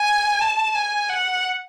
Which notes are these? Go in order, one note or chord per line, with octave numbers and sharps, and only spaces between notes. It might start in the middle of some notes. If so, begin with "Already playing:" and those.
Already playing: G#5
A5
G#5
F#5